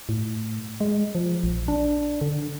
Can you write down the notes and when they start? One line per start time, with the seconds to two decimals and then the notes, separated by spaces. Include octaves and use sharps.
0.09 A2
0.81 G#3
1.15 F3
1.44 A#1
1.68 D4
2.21 D3